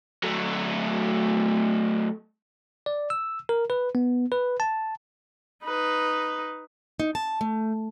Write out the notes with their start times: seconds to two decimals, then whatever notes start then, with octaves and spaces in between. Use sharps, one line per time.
0.23 F#3 A3
2.86 D5
3.10 E6
3.49 A#4
3.70 B4
3.95 B3
4.32 B4
4.60 A5
5.64 D#4 B4
7.00 D#4
7.15 A5
7.41 A3